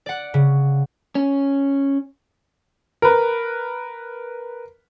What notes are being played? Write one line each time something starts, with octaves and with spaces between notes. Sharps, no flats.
D5 F#5
C#3
C#4
A#4 B4